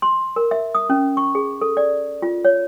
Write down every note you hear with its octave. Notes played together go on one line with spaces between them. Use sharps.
C6
A#4
E5
D#6
C#4
C#6
G#4
A4
D5
F4
C#5